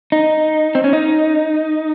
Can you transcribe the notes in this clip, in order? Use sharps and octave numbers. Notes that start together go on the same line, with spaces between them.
D#4
C4
C#4
D#4